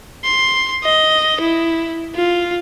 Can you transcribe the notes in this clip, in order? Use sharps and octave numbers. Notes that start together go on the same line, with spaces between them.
C6
D#5
E4
F4